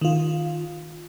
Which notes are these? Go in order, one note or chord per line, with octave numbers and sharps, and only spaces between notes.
D#3 F4